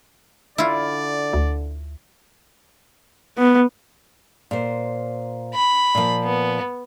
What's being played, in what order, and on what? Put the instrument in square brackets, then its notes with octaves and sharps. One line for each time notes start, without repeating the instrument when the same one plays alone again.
[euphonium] D3 [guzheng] E4 F4 [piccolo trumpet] D5
[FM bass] D2
[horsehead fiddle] B3
[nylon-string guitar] A#2 C5
[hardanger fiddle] B5
[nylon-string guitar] A#2 F3
[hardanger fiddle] B3